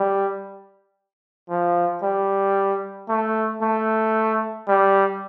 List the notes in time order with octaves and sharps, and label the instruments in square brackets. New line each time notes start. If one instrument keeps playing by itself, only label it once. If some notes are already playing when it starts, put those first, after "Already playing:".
Already playing: [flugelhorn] G3
F3
G3
A3
A3
G3